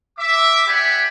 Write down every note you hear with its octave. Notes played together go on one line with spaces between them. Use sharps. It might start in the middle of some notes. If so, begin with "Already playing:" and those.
E5 D6
G4 D5 E5 F#5 G#5 B5